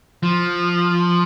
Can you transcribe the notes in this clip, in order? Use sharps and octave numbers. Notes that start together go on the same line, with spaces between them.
F3